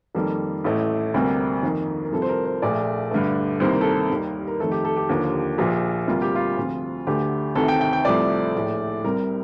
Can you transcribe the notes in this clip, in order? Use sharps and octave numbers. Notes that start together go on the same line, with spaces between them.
F2 D#3 G3 A#3 A4
A1 A2 A3
D2 C3 G3 A#3
F2 D#3 A#3
A#4
C2 C3 F3 A4
C5
A#4
C5
A#1 A#2 A3 D5
G2 D3 A3
C2 C3 D#3 A#3 C5
A#4
A4
A#4
D#2 D#3 G3 A#3
A#4
F2 D#3 A3 A4
G4
A4
G4
D#2 D3 F3 A#3
A#1 A#2 F3
D2 C3 G3 A#3 F4
G4
F4
D2 C3 F3
D2 D3 A3 G4
D2 C3 D#3 A3 A4
G5
G5
G5
C2 C3 F3 A3 D5
A#1 A2 A3
C2 C3 G3 A#4